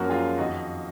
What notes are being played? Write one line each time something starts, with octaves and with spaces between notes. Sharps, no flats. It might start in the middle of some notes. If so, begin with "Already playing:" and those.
Already playing: F#2 F3 A#3 C#4 F#4 A#4
F4 G#4
F2 D#3 D#4 F#4